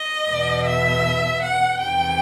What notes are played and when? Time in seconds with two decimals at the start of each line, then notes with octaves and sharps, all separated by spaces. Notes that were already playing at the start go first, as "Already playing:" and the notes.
Already playing: D#5
0.27 E2 B2
0.65 E5
1.42 F#5
1.80 E2 C3 D#3 G5